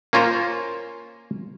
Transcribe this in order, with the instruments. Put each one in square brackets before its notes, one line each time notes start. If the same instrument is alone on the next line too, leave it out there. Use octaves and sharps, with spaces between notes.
[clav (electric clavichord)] A#3 C#4 F4 A#4 C5